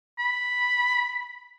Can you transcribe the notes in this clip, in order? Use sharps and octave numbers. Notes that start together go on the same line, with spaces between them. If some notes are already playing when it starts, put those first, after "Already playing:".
B5